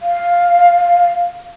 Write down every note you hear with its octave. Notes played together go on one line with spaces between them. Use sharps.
F5